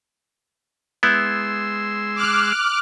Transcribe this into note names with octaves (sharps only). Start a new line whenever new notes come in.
G#3 B3 E4 C6 E6
D6 F6 F#6